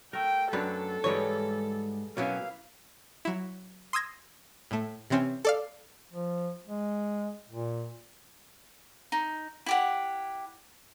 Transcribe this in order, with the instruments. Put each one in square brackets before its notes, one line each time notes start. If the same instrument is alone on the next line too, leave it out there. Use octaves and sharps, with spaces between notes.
[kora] A3 A#4 [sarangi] G5
[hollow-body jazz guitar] F#2 B4 [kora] F#3 D4 D5 [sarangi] A4
[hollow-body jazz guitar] G#2 C#5 [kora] E3 G3 G#3
[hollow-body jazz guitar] B2 F#3 C#4 [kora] A#3 E4 B4 [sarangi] F5
[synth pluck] F#3 E4
C6 D#6 E6 G#6 A#6
A2 A3
C3 E3 C4 C#4
A4 D5 F5
[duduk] F3
G#3
A#2
[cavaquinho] D#4
E4 G4 F#5